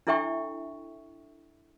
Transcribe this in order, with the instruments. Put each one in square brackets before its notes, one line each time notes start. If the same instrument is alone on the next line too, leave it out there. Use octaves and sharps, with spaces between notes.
[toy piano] D4 E4 A4 E5 G5 C#6